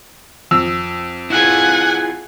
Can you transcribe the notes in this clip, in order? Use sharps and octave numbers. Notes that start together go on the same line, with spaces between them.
F2 E6
E4 F4 G#4 F#5 G#5